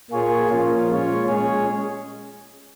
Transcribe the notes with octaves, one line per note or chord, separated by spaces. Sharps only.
A#2 A#3 F4 G#4 C#5
F3 A#3 C#4 F4
A#2 G#3 C#4 F4 C#5
G#3 C#4 G#4 C#5